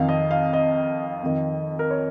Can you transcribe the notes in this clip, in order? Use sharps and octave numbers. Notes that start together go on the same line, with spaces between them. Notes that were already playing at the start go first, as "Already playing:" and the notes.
Already playing: F2 D#3 F5
D#5
F5
D#5
F2 D#3
A#4
C#5